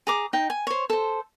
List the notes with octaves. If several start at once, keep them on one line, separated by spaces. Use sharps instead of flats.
G#4 A#5 D6
D#4 G5
G#5
C5 C#5
A4 C5